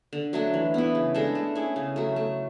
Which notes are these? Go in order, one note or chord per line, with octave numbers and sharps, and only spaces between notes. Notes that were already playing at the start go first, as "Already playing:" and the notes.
D3
F#3 A3 D4
E3
B3 E4
C#3
G#3 D4 A4
A3
C#4 E4 G#4
C#3
F#3 A3
A3